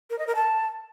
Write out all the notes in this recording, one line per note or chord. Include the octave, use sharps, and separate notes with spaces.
A#4
D#5
A#4
A5